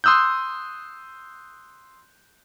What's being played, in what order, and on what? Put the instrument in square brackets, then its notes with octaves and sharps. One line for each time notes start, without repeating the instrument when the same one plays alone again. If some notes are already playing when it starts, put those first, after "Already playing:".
[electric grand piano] C6 D#6 E6 F#6 G6